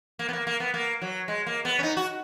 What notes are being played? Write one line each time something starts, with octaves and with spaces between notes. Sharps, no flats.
A#3
B3
A#3
A#3
B3
A#3
F#3
G#3
A#3
B3
C#4
D#4
F#4